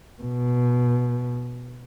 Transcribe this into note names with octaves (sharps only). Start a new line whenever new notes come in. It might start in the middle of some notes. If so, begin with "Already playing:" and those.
B2